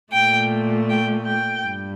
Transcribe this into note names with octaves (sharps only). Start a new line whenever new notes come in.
A#2 A3 G5
G5
G5
G2